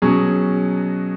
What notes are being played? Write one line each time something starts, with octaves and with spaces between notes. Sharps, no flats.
B2 F#3 C#4 G#4